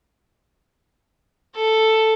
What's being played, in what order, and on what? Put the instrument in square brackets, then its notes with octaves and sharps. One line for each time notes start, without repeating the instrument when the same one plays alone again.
[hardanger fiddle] A4